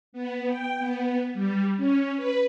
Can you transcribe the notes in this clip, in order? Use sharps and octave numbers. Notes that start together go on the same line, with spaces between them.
B3
G5
B3
G3
C#4
B4